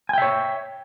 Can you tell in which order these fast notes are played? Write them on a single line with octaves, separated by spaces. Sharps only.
G#5 G5 E5 C#5